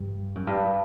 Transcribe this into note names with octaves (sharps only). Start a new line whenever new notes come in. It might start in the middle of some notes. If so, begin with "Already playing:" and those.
Already playing: G2
F#2
G2